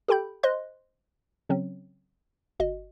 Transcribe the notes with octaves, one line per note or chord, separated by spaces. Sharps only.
G4 A4 G5 B5 G6
C5 D#5 C6 F#6
C#3 F#3 C4 C#4
G1 F#4 D#5